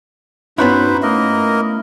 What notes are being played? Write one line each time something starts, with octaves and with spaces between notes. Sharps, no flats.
G2 B3 C#4 D#4 E4 F#4 B4 C5
A3 A#3 A#4 D#5